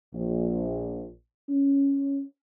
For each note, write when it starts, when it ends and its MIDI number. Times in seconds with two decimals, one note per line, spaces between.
0.14 1.09 34
1.49 2.22 61